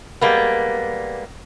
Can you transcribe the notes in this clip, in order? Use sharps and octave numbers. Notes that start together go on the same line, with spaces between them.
G3 G#3 A#3 B3